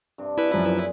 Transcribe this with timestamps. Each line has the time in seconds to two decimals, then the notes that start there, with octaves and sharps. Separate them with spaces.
0.18 G2 C3
0.38 E4 G#4 B4
0.54 F#2 F3
0.68 A#2